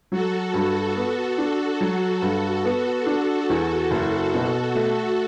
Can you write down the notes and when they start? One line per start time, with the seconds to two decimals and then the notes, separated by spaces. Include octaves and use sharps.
0.11 F#3 F#4 A4
0.54 G2
0.96 B3
1.38 D4
1.80 F#3 F#4 A4
2.22 G2
2.65 B3
3.06 D4
3.50 E2
3.91 F#1
4.34 B2
4.75 A3